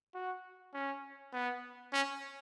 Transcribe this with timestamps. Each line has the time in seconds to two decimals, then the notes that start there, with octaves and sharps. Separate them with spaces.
0.15 F#4
0.74 C#4
1.33 B3
1.93 C#4